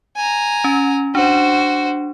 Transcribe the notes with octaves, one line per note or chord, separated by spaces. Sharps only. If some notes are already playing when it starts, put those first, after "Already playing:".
G#5 A#5
C#4
D4 F#4 C5